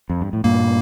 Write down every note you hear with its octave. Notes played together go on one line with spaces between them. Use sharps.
F2
G2
A2
G2 A#2 A#3